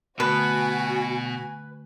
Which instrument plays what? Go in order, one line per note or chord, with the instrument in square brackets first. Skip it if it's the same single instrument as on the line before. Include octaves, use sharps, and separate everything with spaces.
[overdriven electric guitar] B2 B3 [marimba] D3 A3 [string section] F#4 G#5 [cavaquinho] B4